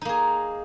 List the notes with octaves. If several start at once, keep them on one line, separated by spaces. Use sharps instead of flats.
A#3 D#4 G#4